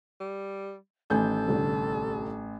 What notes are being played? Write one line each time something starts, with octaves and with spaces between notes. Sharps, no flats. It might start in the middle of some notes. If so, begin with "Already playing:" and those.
G3
A1 D#3 A4 G#5 G6
C2 D3